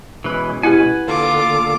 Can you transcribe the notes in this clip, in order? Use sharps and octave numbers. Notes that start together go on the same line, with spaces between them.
B2 E3 G#3 C#4 B4
E4 G4 B4 F#5 G#5
D3 A#3 F4 A4 D6